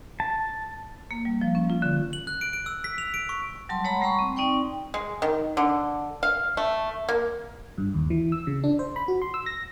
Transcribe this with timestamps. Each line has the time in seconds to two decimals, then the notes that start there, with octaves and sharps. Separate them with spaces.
0.20 A5
1.11 A#3
1.25 G3
1.41 F3
1.55 C#4
1.70 F4
1.82 D3
2.13 F#7
2.27 F#6
2.41 D7
2.53 D7
2.66 E6
2.84 B6
2.98 F7
3.14 D7
3.29 C#6
3.69 F#3 G3 A5 C6
3.84 G#3 C#5 F#5 A#5 B5
4.01 G3 A3 A#5 B5 C#6
4.19 C4
4.36 C4 D#4 D5 G5 C#6
4.94 G#3
5.22 D#3
5.57 D3
6.23 F5
6.57 A3
7.09 A#3
7.78 G2
7.94 D#2
8.10 E3
8.32 E6
8.47 C#3
8.64 D4
8.79 C5
8.96 B5
9.08 F#4
9.22 C6
9.34 E6
9.46 A#6